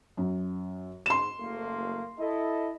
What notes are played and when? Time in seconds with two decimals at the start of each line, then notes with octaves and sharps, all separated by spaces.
0.17 F#2
1.06 G#2 C6 E7
1.39 F#1 A3 A#3
2.19 E4 A4 D#5